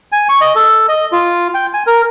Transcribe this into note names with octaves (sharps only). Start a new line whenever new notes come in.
G#5
C#6
D#5
A4
D#5
F4
G5
G#5
A#4